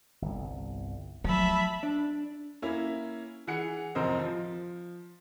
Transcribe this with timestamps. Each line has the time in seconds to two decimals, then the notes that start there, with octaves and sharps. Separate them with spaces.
0.22 G1 C2
1.24 F3 F#3 A3 E5 A5 B5
1.83 D4
2.62 A#3 C#4 E4
3.47 E3 G#4 F#5 C#7
3.95 A1 F2 C3 A#4 C5 D#5
4.19 F3